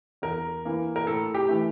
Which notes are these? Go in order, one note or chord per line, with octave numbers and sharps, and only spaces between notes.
E2 A#4
E3 A#3
A#4
A2 A4
G4
E3 A3